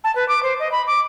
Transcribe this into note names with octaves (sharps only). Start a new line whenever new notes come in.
A5
B4
D6
C5
D#5
B5
D6